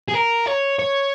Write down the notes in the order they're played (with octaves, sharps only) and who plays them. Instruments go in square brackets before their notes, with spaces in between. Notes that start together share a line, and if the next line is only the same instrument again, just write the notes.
[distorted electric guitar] G#4
A#4
C#5
C#5